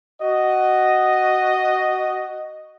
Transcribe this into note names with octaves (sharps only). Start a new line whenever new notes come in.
F#4 D#5